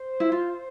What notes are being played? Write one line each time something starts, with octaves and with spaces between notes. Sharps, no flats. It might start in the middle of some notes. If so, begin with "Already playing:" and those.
Already playing: C5
E4
F4